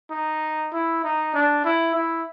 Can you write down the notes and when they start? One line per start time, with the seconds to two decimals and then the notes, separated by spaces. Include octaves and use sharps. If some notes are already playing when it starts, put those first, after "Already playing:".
0.11 D#4
0.73 E4
1.04 D#4
1.34 D4
1.65 E4
1.95 E4